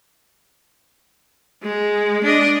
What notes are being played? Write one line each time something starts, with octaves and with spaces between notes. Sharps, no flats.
G#3
D4 D#5